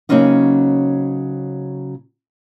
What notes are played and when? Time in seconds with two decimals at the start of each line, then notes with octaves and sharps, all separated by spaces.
0.09 C#3 F#3 A#3 C4 C#4 D#4